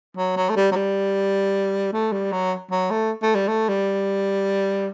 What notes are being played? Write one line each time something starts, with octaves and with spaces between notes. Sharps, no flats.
F#3
F#3
A3
G3
F#3
G3
A3
G3
F#3
F#3
A3
A3
G3
A3
G3